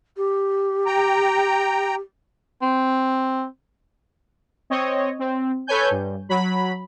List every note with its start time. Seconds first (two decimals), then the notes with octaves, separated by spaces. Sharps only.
0.16 G4
0.86 G5 A#5
2.62 C4
4.70 C4 C#5 D#5
5.19 C4
5.67 A4 B4 C#5 G#5 G6
5.91 G2
6.29 F#3 B5